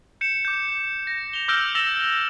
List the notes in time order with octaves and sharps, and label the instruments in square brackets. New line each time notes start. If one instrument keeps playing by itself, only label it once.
[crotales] G6 C#7 E7
D6 G6
A#6
F7 G7
D6 E6 F6 G6 A#6 D7
E6 A6 A#6 E7 F7